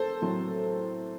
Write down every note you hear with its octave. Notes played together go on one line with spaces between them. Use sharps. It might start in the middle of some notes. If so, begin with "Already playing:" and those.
Already playing: A4 C5
A2 F#3 C4